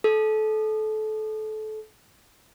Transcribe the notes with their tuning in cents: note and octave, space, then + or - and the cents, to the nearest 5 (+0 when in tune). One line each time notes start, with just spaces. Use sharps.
A4 -25